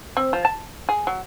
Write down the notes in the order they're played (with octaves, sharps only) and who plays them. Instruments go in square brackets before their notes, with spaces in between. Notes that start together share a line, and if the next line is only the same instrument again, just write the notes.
[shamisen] C4
F3
A5
G#4
F#3